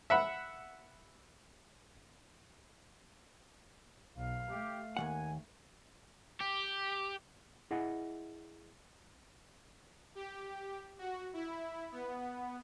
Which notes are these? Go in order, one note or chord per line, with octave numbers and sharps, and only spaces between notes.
E5 F#5 B5
B1 F5
A3 G4
D#2 F3 A#3 F#5 G#5
G4
E4 G#4 D#5 F#5
G4
F#4
E4
B3